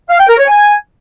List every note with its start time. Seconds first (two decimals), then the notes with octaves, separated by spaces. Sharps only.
0.09 F5
0.19 G5
0.28 A#4
0.38 C#5
0.47 G#5